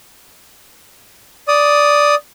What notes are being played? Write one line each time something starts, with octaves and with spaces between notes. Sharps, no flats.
D5 D#6